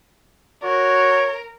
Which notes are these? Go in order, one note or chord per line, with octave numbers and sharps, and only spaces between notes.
F#4 A#4 C#5